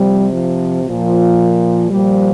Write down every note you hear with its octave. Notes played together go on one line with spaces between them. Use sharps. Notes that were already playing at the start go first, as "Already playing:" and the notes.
Already playing: C3 F3 G3
F3
A#2 F3
A#2 F3 G3